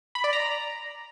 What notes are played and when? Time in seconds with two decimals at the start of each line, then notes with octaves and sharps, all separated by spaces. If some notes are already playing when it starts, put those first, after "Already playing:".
0.15 B5
0.24 D5
0.33 A#5